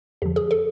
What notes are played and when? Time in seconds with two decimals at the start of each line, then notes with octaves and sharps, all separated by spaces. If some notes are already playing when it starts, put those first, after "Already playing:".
0.22 F2 D3 F3 G4
0.36 G#4
0.51 A4